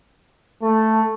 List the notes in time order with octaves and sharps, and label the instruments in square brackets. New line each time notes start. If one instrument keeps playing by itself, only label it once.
[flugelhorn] A3